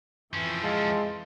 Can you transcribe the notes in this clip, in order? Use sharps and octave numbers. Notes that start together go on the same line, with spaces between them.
F2 E3 F3 C#4 G5
G#3 F4 A5 C6